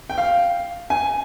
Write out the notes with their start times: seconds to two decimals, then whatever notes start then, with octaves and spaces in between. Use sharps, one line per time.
0.10 G5
0.18 F5
0.90 G#5